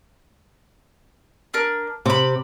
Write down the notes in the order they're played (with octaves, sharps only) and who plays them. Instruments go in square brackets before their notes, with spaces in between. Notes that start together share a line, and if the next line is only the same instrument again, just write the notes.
[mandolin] D4 A#4
[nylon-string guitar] C3 [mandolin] B5 D6